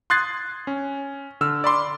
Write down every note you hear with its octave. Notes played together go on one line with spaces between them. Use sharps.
C6 D#6 F#6 G#6 A6 C7
C#4
D3 E6 F6
D5 B5 C6 D6